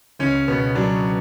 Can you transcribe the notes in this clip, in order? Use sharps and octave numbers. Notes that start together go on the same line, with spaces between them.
C#2 C#4
B2 B3
F#3 D4